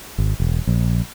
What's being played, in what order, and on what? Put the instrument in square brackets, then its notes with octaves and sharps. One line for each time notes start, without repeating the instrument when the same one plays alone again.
[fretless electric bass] G#1
E1
A#1